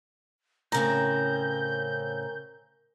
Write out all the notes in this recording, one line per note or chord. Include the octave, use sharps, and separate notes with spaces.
A2 C#3 C4 A#4 G#5 A#5 G6